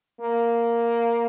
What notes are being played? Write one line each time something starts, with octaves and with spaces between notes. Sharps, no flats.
A#3